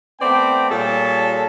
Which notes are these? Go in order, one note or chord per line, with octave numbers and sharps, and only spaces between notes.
A3 B3 C4 D5 G5
A#2 G3 G#4 A4 C#5 A5